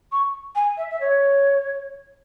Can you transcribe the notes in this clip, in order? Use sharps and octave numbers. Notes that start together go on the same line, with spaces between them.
C#6
G#5
E5
E5
C#5